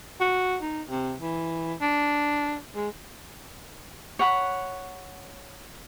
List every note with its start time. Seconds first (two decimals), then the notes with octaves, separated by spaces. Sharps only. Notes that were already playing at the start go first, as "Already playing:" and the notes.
0.20 F#4
0.62 D#4
0.89 C3
1.21 E3
1.81 D4
2.76 G#3
4.19 C#5 F#5 B5